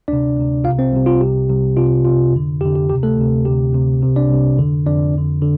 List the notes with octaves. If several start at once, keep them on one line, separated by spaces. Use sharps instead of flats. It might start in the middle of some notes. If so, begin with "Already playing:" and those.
D2 C3 D4 D5
D2 C3
C2 C3 F4 F5
C4 C5
C2 C3
F4
C2 C3 G4
C2 C3
C2 C3 F4
C2 C3 F4
F2 D3
F2 D3 G4
G4
D2 C3 G4
A3 A4
D2 C3
D2 C3 G4
D2 C3
C2 C3
D4 D5
C2 C3
F2 D3
F2 D3 D4 D5
F2 D3
D3